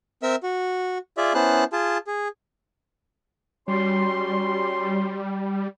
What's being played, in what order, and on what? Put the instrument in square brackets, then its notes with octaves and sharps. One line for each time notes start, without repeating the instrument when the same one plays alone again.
[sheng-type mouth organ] C4 A#4 E5 E6
F#4
F4 G#4 D5 E5
B3 C#4 E4 C5 A5 F#6
F4 G#4 A5
G#4
[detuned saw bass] G3 [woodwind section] C#4 F#4 C6